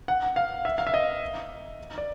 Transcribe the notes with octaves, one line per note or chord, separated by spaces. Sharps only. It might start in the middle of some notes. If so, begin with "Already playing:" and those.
F#5
F5
E5
F5
E5
D#5
D5